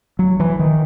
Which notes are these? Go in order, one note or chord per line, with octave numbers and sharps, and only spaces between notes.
F#3
E3
D#3